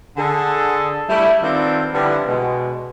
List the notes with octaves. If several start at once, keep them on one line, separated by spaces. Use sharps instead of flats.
D3 G#4 A4
G3 A3 D4 E4
D#3 C4 D4 F4 A4 B4
D3 F3 G3 B3 D4 E4
B2 G#3